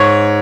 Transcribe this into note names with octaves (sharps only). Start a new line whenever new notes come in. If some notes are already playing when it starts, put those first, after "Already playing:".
Already playing: G#2 C#5 C#6